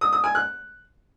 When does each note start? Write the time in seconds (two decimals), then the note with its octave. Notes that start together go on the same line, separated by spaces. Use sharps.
0.01 D#6
0.13 D#6
0.24 G#5
0.35 F#6